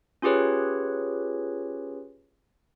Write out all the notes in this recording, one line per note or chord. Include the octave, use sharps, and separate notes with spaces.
C#4 F4 G4 G#4 B4 C#5